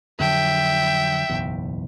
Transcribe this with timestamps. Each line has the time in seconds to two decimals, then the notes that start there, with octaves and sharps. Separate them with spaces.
0.19 F2 D3 F#3 E5 G5
1.29 F#1 B1 E2